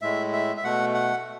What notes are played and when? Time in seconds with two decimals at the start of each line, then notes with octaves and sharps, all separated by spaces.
0.02 A2 G#3 E5
0.33 E5
0.57 E5
0.64 B2 A3 F#5
0.94 F#5